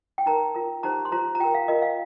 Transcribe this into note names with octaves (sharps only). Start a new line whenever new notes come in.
G5
D#4 A#4 A#5
F4 A#4
D#4 G4 C5 A#5
C6
F4 C5 A#5
A#5
F4 A#4 G5
F5
F4 A#4 D#5
F5